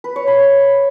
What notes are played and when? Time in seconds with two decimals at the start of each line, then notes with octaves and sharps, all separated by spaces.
0.04 B4
0.16 C#5
0.28 B5
0.39 C#6